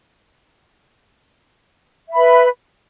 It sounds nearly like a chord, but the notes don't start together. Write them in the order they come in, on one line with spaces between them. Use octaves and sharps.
E5 B5 B4